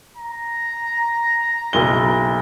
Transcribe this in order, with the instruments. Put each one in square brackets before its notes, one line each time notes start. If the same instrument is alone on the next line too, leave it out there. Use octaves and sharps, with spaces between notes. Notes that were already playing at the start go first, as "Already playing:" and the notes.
[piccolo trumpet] A#5
[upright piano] F#1 B1 G7